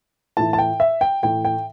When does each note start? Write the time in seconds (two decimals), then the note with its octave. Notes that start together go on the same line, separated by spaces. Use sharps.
0.37 A2 E3 A5
0.53 A5
0.58 G5
0.80 E5
1.01 G5
1.23 A2 E3 G5
1.45 G5